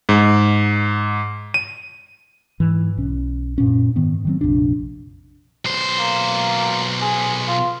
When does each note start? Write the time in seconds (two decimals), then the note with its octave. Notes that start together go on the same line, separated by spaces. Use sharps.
0.09 G#2
1.54 D#7
2.60 G#2 E3
2.97 B1 C#4
3.58 F#2 A#2 C#4
3.96 G#2 D#3 B3
4.25 D#3 F#3 C4
4.41 A#1 F2 C3 D4
5.65 B1 C5
5.99 A#3
7.02 G#4
7.48 F4